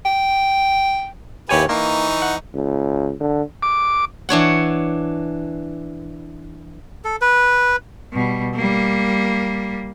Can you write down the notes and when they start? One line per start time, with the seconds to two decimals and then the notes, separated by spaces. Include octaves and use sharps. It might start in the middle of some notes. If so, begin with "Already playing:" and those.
0.05 G5
1.49 D#2 E4 G4 B4 C#5 G#5
1.69 E3 A#3 D#4 C#6
2.22 F#5
2.54 C#2
3.20 D3
3.63 D6
4.29 E3 D4 C#5 F#5
7.04 A4
7.21 B4
8.13 B2 G3
8.55 G3 A#3